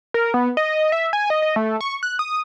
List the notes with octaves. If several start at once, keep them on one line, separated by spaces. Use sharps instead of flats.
A#4
B3
D#5
E5
G#5
D#5
D#5
A3
C#6
F#6
D#6